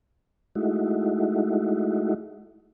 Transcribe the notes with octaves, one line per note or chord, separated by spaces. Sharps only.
G#3 A3 D#4 E4 F#4